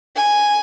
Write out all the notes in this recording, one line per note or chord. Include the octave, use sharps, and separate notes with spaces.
G#5